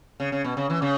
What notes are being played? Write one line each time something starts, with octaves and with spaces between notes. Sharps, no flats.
C#3
C#3
B2
C#3
E3
C#3